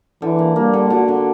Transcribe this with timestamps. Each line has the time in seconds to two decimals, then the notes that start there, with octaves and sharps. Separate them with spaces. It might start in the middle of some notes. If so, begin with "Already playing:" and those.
0.22 D3 E3
0.39 A#3
0.56 G3 A#3
0.73 D3
0.90 D3 F#4
1.08 D3